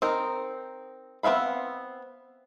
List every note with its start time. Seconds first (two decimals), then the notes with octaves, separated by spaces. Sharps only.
0.02 C4 D#4 A#4
1.23 B3 C4 E5 F5 B5